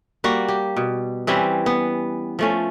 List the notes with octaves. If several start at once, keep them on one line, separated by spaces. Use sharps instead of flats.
G3 A#3 F#4
G4
B2
E3 G3 C4 C#4
B3
F3 A3 C#4